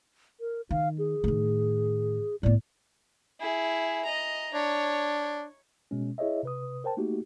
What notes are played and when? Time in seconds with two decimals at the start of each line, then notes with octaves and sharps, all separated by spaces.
0.40 A#4
0.71 D#3 F5
0.99 G#4
1.24 A2 D#3
2.43 A2 B3 D5
3.40 E4 G#4
4.05 D#5 A#5
4.54 D4 C#5
5.91 B2 G#3 C#4
6.18 E4 G#4 C#5 D#5 E5
6.43 C3 B4 D#6
6.84 A#4 C5 G5 A5
6.97 A3 A#3 D#4 F#4 G4